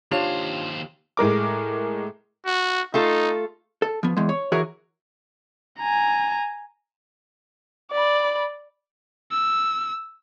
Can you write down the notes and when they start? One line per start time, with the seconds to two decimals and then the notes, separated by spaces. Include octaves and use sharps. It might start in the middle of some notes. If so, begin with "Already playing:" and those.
0.11 D#2 D4 F4 G4 C5 C#5 F5 F7
1.17 A2 G#3 A#4 D6
2.46 F#4
2.94 A3 D#4 F4 A4
3.82 A4
4.03 F3 B3
4.17 E2 G#3
4.29 C#5
4.52 E3 F#4 G#4 A#4 C#5 E5
5.79 G#5 A#5
7.91 D5 B5
9.32 E6